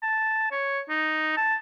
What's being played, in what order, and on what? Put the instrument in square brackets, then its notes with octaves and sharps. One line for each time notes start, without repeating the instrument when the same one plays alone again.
[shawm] A5
C#5
D#4
A5